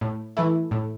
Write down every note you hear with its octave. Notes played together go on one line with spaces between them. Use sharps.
A2
E3 A3 E4
A2